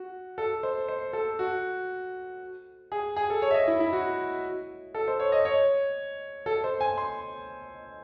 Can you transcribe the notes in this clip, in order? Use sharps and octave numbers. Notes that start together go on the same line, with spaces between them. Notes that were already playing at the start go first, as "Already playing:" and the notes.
Already playing: F#4
A4
C5
C5
A4
F#4
G#4
G#4
A4
C#5
E5
D#5
E4
E4
F#4
A4
C5
C#5
D#5
C#5
A4
C5
G#5
C6